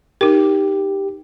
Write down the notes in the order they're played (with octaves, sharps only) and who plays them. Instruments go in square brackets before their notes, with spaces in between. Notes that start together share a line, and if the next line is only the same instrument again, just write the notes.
[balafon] D#4 A#4 [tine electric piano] G4